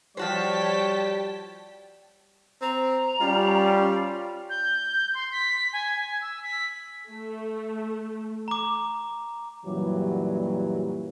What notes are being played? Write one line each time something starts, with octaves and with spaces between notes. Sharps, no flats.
F3 G3 F#4 C5 C#5 G5 A5 B6
C4 A#5
G3 C#4 F4
G6
C6
B6
G#5
E6
B6
A3
A#5 D6
F#2 A#2 E3 F#3 G3